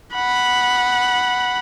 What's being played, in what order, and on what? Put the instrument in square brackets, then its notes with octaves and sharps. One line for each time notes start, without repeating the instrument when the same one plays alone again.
[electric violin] F#5 B5